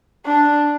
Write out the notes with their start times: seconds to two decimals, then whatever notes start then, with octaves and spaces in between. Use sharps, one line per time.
0.25 D4